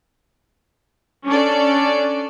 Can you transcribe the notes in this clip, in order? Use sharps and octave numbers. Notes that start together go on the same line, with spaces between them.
C#4 D4 A4 D5